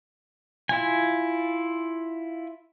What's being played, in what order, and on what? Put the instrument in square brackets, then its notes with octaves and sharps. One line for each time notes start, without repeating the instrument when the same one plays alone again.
[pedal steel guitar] E4 F4 G#5